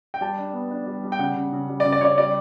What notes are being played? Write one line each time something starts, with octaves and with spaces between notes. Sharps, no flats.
G5
G3 A5
D4
B3
D4
G3
G3
G5
C#3 F#5
C#3
C#3
G3
D5
C#3
D5
C#3 C#5 D5
G3 D5